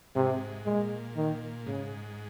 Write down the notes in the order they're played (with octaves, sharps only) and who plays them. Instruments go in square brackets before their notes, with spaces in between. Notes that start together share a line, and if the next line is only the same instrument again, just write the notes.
[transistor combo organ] G#2 [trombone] C3
[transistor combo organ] A#2 [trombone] G#3
[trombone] D#3
[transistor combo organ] G#2 [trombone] C#3